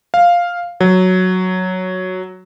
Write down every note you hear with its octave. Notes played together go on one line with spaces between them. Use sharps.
F5
F#3